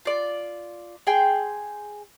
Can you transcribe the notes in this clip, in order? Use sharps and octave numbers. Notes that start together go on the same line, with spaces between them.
F4 D5
G#4 G5 C6